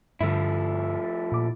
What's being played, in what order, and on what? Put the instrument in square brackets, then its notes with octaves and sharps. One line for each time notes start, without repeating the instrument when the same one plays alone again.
[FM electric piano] G2 D3 [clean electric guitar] F3 A3 E4
[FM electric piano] A#2 D6